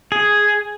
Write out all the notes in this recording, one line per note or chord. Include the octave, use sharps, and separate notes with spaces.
G#4